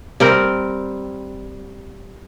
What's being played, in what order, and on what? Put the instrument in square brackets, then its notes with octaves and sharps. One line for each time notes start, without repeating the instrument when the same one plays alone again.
[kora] G3 C4 A#4